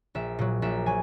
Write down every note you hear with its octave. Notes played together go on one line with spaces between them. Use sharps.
A#1 E5
A#2 F#3
A#1 E5
F#3 G#5